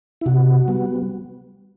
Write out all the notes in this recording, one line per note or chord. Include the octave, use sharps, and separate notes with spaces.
E4
C3 F#4
G3 B3